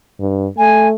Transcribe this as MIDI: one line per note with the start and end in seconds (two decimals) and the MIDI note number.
0.20 0.47 43
0.58 0.95 57
0.58 0.87 80